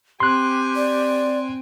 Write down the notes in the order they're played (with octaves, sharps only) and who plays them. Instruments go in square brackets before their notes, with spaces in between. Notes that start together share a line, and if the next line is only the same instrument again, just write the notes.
[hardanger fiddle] C4 G#5 [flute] G4 [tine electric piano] C6 F#6
[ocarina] D5